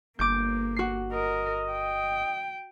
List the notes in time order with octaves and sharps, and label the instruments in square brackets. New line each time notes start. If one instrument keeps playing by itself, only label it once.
[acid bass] G1 [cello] A#3 [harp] D6 G6
[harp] F#4 C7
[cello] A#4 [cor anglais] D#5
[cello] G5